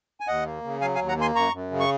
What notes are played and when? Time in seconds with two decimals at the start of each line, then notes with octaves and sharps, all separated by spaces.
0.20 G#5
0.27 D#2 D#5 F#5
0.45 A#3
0.64 C#3
0.81 F#3 F5 G#5
0.95 F5 G#5
0.99 D#2
1.08 F#5 A#5
1.17 A#3 G#5 C6
1.35 F#2 A#5 C#6
1.53 F#2
1.71 C#3
1.80 C#6